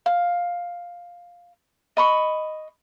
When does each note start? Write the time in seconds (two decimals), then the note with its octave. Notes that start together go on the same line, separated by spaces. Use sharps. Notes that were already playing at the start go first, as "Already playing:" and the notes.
0.06 F5
1.97 D#5 B5 C#6